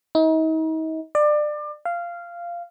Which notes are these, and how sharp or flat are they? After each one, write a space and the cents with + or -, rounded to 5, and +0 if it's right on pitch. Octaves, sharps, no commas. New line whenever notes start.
D#4 +40
D5 +25
F5 -10